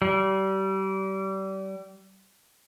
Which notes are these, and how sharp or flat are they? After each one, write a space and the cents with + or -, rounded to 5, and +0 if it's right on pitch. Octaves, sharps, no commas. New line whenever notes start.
G3 -30